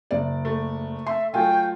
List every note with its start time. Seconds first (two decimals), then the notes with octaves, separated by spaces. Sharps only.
0.11 F#1 D5
0.45 A3
1.07 E5 C6
1.34 F#3 A3 F4 G5 G#5